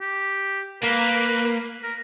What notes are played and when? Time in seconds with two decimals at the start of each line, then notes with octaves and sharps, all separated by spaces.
0.01 G4
0.83 A#3 B4
1.83 A#4